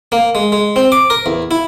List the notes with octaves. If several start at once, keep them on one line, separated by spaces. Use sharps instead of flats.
A#3
G#3
G#3
C4
D6
A#4
E2
E4